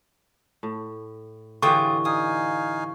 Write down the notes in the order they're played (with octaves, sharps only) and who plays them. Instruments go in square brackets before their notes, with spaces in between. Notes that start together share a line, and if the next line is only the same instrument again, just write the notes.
[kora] A2
[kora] D3 E3 G4 [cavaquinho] F4 G#4 G5 [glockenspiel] C#6
[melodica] D#4 F5 G#5 [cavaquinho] D#6